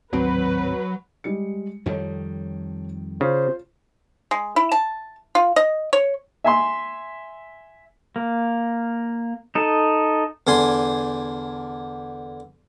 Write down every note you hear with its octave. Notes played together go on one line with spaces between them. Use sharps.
D1 G#1 D2 F#3 C4 B4
G3 G#3 C#7
F2 D#3 G3 A4 C#5
C#3 F4 C5
G#3
E4
A5
F4
D#5
C#5
E5 G#5 C6
A#3
D#4 A4
E2 D3 G#5 C6